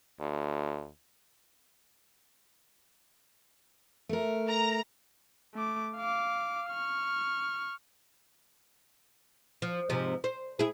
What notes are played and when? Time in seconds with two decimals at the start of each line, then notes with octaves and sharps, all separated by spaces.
0.20 D2
4.09 A3 A#4
4.49 A#5
5.54 A3 D6
5.96 F5 D6
6.70 C#6 F6
9.62 F3
9.90 G#2 C3 F3
10.24 C5
10.59 E4 G#4